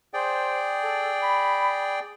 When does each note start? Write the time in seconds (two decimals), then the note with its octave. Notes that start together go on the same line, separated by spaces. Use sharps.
0.14 G#4 C5 D5 G5
0.82 A4
1.22 B5